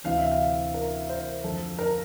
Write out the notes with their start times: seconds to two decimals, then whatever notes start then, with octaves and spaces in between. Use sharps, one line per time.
0.04 D2 C3 E3 F5
0.18 E5
0.31 F5
0.74 A#4
1.09 C5
1.44 F2 D3 A4
1.78 A#4